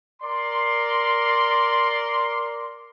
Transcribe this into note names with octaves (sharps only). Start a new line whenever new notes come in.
A#4 D5 C6